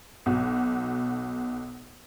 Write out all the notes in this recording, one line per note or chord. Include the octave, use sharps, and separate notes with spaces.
B1 F#4